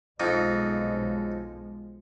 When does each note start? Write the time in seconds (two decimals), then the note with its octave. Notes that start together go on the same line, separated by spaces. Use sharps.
0.20 B1 F2 F3 G#3 D#4